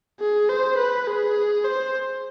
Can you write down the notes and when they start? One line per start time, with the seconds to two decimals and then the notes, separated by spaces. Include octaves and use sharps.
0.20 G#4
0.50 C5
0.78 B4
1.07 G#4
1.65 C5